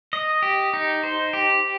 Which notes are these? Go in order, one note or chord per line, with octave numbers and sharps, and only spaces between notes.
D#5
G4
D#4
C5
G4